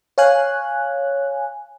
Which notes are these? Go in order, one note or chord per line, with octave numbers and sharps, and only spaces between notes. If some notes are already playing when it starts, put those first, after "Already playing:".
C#5 F5 G#5 F#6